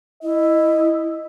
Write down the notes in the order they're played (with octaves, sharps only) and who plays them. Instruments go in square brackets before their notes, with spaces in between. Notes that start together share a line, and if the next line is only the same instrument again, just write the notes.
[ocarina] E4 [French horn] D#5